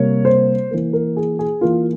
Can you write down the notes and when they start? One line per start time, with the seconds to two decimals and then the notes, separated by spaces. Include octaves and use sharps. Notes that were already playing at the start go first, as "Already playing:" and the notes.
Already playing: C3 G3 A#3 C#5
0.25 C5
0.71 E3 A#3
0.93 A#4
1.17 G#4
1.39 G#4
1.61 E3 A#3 F4